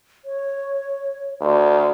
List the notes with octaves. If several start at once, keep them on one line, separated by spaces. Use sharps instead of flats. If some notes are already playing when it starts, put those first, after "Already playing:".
C#5
D2